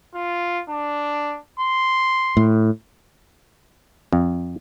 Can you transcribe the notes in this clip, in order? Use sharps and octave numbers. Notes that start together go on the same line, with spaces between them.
F4
D4
C6
A2
F2